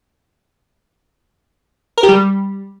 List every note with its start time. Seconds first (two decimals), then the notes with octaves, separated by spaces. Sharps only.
1.98 A#4
2.03 G4
2.09 G3